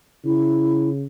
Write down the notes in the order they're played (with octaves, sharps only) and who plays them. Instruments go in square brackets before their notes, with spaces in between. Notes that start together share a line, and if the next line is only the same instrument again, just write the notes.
[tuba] C#3 [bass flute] E4